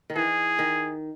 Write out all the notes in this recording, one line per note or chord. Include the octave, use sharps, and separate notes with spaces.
D#3
E3 G#4
D#3